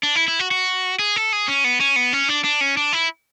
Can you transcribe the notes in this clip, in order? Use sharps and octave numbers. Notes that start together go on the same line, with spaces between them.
D4
E4
E4
F#4
F#4
G#4
A4
G#4
C#4
B3
C#4
B3
C#4
D4
D4
C#4
D4
E4